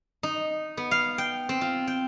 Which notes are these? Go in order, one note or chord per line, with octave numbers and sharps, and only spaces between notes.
D#4
B3
F5
G5
C4
F4
G5